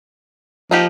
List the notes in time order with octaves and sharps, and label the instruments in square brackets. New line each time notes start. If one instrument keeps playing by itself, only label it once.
[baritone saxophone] F3 [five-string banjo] A#3 D#4 G4